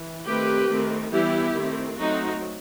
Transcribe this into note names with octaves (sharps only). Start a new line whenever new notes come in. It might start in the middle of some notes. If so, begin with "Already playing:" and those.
Already playing: E3
D#3 A3 C4 G4 B4
D#3 A3 C4
E3 G3 B3 E4 G4
D#3 A3 C4
F#3 A3 C4 D#4 F#4